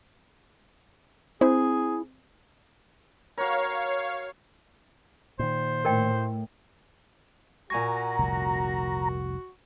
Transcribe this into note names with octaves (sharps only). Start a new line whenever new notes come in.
C4 E4 G#4 C5
F#4 A#4 C#5 F5
A#2 D#3 C5
A2 A#4 D#5 G5
A#2 F#4 G#5 A#5 C#6
F1 C2